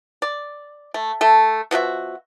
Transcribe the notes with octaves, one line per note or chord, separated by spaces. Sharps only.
D5
A3
A3 A4
B2 F3 F#4 E5